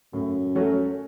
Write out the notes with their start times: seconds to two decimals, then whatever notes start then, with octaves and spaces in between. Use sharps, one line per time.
0.13 F#2 A2
0.55 F#3 A3 C#4 F#4